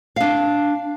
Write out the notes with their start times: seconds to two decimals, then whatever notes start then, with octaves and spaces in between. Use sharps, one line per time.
0.16 D4 F5